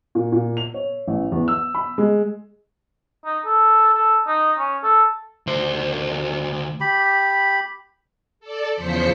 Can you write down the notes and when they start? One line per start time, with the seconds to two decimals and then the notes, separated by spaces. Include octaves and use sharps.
0.15 A#2
0.32 A#2
0.57 F7
0.74 C#5
1.08 A1
1.32 E2
1.48 E6
1.75 B5
1.98 G#3
3.25 D#4
3.45 A4
3.94 A4
4.27 D#4
4.58 C#4
4.83 A4
5.47 D2 C5
6.80 G4 B5
8.40 A4 D5
8.74 E2 C#3 F3 C5 B6 C#7